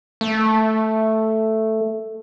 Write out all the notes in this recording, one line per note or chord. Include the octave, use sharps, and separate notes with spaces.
A3